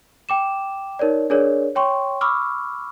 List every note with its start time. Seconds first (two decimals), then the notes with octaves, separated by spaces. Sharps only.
0.29 G5 D6 E7
0.99 D#4 A#4 C#5 D5
1.30 D4 G#4 A#4 C#5 D5
1.76 C#5 G5 C6 C#6
2.21 B5 C#6 D6 E6 F6